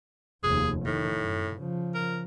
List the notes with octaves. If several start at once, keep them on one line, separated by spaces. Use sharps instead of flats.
F1 D#2 G#4
A2 D#3
F#2
C#3 F3
A#4